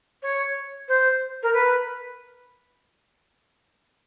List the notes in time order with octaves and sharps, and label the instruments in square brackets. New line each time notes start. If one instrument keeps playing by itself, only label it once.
[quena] C#5
C5
A#4
B4